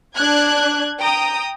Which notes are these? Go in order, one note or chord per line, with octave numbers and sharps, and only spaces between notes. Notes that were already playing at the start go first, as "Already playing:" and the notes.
D4 F#6 G#6
G5 A#5 D#6